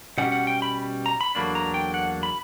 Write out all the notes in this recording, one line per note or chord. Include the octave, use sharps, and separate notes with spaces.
B2 G3 C#4 F#5
F#5
G5
B5
A#5
B5
E2 D3 F#3 A#3 D4 B5
A#5
G5
F#5
B5